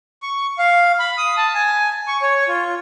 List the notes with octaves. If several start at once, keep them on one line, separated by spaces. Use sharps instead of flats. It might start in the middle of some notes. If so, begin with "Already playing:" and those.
C#6
F5
B5
D#6
A5
G#5
C#6
C#5
F4